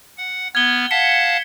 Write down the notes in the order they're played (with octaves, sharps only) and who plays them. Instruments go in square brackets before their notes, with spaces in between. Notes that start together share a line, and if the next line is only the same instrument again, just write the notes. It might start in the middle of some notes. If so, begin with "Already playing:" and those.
[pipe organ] F#5
[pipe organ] B3 F6 [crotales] G#6 G7
[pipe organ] F5 F#5 A5 [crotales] B6 C#7